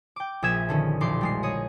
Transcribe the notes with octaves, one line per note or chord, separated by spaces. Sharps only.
G5 D6
A#1 G#4 E5 G#6 E7
D3 D#3 C#4
E1 A#1 C6 D6
G3 G#3 C7
G#4 C#5 D#5